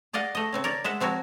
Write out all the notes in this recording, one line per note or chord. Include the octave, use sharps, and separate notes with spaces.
G#4 D5 D#5 F5 F#5
A3 D#5
C#3 C4 C#4
A#4 C#5 D5
G#3 C5 E5 F#5
F3 C4 F#4 A#4 C#5